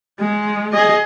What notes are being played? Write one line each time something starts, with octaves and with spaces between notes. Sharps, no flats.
G#3
G#4 D#5